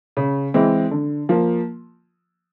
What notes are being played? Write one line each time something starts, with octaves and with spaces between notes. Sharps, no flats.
C#3
E3 G#3 C4
D3
F3 A#3